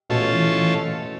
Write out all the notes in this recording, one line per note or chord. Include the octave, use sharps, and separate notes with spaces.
B2 A3 C#4 F4 A4
E3
E3